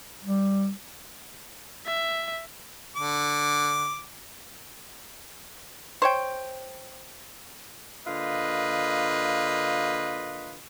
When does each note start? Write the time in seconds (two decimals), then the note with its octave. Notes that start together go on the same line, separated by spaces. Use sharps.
0.24 G3
1.86 E5
2.96 D3 D6
6.02 C5 C#5 G5
8.07 D3 A#3 F4 B4 D#5